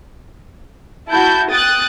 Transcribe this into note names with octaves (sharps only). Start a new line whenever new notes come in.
E4 F#4 A5 G6
G5 D#6 F#6 A6